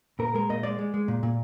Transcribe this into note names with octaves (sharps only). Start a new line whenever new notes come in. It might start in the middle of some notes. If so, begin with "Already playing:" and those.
A#2 A#4
G#3 A#4
A#2 D#5
G#3 D5
G#3
G#3
A#2
A#2